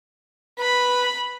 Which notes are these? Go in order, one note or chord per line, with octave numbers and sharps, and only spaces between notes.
B4 B5